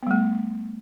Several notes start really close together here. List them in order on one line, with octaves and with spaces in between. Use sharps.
B3 G3 A3